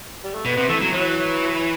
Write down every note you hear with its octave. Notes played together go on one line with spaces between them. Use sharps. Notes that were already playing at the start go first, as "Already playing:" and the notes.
G3
A3
B2 B3
C3 B3
E3 A3
F#3
E3 F#3